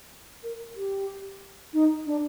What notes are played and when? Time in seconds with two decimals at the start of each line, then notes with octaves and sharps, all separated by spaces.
0.44 A#4
0.76 G4
1.73 D#4
2.06 D4